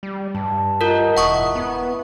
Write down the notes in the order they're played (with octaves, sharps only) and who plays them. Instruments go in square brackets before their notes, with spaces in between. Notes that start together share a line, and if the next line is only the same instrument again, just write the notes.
[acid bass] G3
[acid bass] G2 [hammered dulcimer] A5
[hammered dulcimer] D#4 F#5 [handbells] F4 A#4
[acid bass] E1 [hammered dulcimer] E4 [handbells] F#5 C#6 D#6
[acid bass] B3